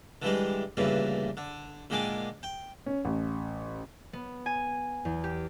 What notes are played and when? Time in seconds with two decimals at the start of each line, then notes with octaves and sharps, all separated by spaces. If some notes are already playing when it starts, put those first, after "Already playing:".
0.22 D3 E3 G3 G#3
0.77 D2 G2 A#2 C#3 E3
1.37 D3
1.90 A#2 D3 D#3 G#3 G#5 D6
2.43 G5
2.86 C#4
3.05 A1
4.13 B3
4.46 G#5
5.05 E2
5.24 G4